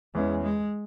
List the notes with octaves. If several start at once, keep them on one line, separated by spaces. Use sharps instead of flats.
E2 E3 G#3 C#4
G#3